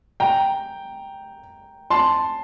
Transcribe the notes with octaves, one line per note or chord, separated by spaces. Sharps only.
G5 A#5
A5 C6